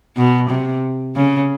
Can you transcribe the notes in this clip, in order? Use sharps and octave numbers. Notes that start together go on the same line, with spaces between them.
B2
C3
C#3